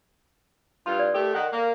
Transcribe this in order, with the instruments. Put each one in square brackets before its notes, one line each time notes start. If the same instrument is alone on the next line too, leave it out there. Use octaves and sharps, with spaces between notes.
[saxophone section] G2 F4 [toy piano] C6
[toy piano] D5
[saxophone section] A3 G4 [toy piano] A4 A#4
[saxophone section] D#3 F#5
A#3